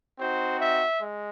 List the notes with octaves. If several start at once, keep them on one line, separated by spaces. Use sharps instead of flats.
C4 D#4 F#4 C5
E5
G#3